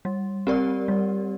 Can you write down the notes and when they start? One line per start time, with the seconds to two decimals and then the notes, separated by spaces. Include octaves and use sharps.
0.05 G3
0.47 C4 G4 A#4 D5
0.88 G3